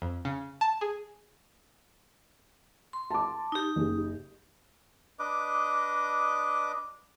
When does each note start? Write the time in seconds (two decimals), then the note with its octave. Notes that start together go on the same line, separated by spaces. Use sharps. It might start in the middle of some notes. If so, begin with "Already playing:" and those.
0.02 F2
0.25 C#3
0.61 A5
0.81 G#4
2.93 C6
3.11 A5 D6
3.52 D#4 G4
3.76 F#1 G#4
5.19 D4 B4 D#5 D6